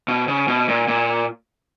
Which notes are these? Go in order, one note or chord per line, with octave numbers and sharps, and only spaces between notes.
B2
C#3
B2
A#2
A#2